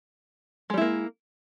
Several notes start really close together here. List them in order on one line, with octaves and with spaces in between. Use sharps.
G#3 G3 E4 A#3